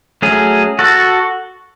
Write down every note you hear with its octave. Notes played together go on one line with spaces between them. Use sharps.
F#3 A3 C#4 G#4
F#4 A4